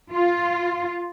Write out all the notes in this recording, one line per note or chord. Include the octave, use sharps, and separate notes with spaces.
F4